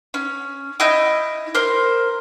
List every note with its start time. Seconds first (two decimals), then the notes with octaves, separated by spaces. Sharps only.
0.14 C#4
0.80 E4 D#5 G6
1.55 A#4 C5